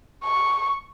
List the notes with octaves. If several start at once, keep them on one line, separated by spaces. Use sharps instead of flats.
C#6